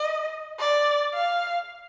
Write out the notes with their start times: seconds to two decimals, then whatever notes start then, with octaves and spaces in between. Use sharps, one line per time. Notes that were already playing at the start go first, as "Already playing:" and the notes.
Already playing: D#5
0.59 D5
1.13 F5